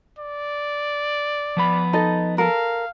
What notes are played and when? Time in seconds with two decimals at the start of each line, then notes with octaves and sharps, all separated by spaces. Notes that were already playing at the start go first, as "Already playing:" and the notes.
0.19 D5
1.57 F3 B3 B5
1.93 D#4 A4 D#5
2.38 A4 A#4 F5